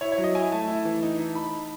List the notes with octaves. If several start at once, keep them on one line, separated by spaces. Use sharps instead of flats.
E4 C#5
C#5
F#3
D#5
E4 G#5
A3 A5
E4
E3
D#4
D#4
D#4 B5